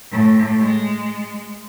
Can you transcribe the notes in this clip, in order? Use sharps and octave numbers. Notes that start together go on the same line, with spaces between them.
A2
G#3